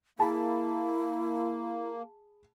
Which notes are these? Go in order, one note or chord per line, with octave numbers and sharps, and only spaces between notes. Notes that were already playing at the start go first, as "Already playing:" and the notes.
A#3 E4 G#4 A5 B5